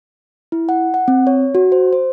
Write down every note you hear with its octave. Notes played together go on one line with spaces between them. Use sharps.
E4
F#5
F#5
C4
C#5
F#4
C5
C5